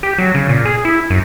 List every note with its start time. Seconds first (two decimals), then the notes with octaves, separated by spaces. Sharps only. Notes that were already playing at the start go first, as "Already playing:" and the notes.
0.03 G4
0.18 F#3
0.35 C#3
0.49 A#2
0.65 G#4
0.85 E4
1.10 F#2